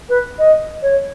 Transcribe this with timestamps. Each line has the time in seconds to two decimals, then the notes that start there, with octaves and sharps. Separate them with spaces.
0.09 B4
0.39 D#5
0.82 C#5